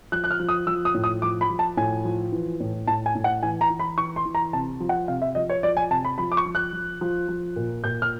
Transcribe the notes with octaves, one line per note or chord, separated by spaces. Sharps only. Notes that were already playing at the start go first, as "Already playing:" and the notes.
F3 F#6
F#6
F6
F3
D#6
F3 E6
D#6
A2
D#6
F3 D6
B5
F3
A5
A2 G#5
F3
E3
A2
A2 A5
G#5
A2
F#5
E3 G#5
A#5
E3
B5
E3 C#6
C6
E3
A#5
C3 A5
F3
F#5
C3 F5
E5
F3 D#5
C#5
F3 D5
G#5
C3 A5
B5
F3 B5
D6
C#6
F3
F#6
F3
F3
F3
A#2
A#2 G6
F6